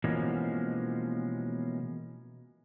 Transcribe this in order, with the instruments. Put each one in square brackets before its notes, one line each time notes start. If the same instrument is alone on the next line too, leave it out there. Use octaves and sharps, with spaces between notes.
[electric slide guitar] B2 E3 F3 G#3 A#3 C#4